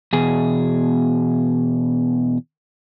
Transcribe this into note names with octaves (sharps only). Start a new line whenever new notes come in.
E2 B2 G#4